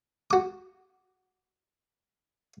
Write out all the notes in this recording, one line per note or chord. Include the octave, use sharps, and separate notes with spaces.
F#4 D6